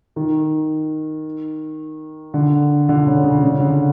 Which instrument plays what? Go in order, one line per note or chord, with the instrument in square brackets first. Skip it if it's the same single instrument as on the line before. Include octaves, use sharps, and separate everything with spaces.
[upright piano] D#3
D3
D3
C#3
C#3
C#3
D3